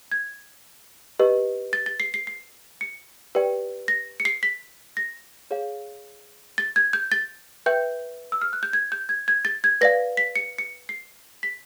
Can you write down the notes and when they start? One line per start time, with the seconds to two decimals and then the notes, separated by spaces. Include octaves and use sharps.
0.12 G#6
1.19 G4 B4 D#5
1.73 A6
1.86 A6
2.00 C7
2.14 C7
2.27 C7
2.81 C#7
3.35 G4 B4 D5 G5
3.88 A#6
4.20 C#7
4.25 C7
4.43 B6
4.97 A#6
5.51 G#4 C#5 F5
6.58 A6
6.76 G#6
6.93 G6
7.12 A6
7.66 B4 E5 G5 G6
8.32 E6
8.41 F6
8.53 F#6
8.63 G6
8.73 G#6
8.92 G6
9.09 G#6
9.28 G#6
9.45 A6
9.64 G#6
9.81 B4 D5 F5 A#6
10.17 B6
10.36 C#7
10.58 C#7
10.89 C7
11.43 B6